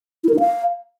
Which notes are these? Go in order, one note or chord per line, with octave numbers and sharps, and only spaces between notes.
E4
A#4
D#4
F5